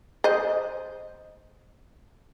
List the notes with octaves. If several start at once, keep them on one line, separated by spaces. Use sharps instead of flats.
C5 D#5